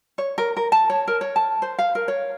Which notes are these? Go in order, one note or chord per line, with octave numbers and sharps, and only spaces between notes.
C#5
A#4
A#4
A5
C#5
A#4
C#5
A5
C5
F5
A#4
C#5